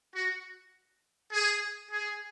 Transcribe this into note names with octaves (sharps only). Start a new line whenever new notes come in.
F#4
G#4
G#4